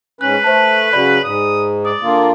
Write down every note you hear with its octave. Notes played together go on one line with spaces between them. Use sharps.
G#2 C#4 B4 F#6
A3 C5 A5
C#3 F#3 D5 B5
G#2 D#6
D5 D#6
D3 A#3 F4